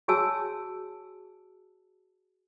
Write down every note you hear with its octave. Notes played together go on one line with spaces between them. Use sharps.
F#4 G#4 C#5 G#5 A5 E6